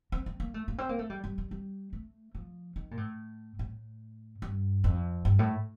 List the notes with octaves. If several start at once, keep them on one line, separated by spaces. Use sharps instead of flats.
C4
C4
A#3
A3
A#3
C4
A#3
A3
G3
G3
G3
G3
A3
F3
D#3
A#2
A2
A2
G2
F2
G2
A2